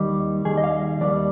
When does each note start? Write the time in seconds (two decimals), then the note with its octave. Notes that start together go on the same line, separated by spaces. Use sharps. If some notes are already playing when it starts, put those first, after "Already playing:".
Already playing: D#2 D#3 G3
0.45 D#2 D#3 G3 G#4
0.58 D#5
0.64 F5
1.01 D#2 D#3 G3 D5